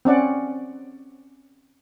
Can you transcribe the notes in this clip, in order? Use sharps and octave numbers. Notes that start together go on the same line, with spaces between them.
C4 C#4 D5 F#5